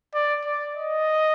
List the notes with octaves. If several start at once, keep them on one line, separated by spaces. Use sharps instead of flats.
D5
D5
D#5